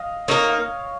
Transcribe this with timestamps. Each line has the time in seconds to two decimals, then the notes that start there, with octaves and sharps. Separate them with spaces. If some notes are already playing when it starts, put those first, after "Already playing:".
Already playing: D#5 F5
0.28 A#3 D#4 A#4 C#5
0.49 F5